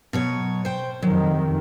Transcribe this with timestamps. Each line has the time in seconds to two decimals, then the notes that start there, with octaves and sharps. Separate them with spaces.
0.13 B2 F#3 C#5
0.65 C5 G5
1.02 F2 C3 D#3 F#3